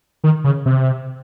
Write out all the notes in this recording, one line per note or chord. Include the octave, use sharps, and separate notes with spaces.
D#3
C#3
C3